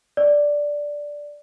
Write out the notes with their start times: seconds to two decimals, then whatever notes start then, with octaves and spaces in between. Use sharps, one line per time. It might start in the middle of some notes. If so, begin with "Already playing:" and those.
0.17 D5